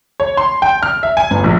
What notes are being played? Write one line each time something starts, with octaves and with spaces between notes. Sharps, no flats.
C#5
C6
G5
F6
E5
G#5
G1
A#1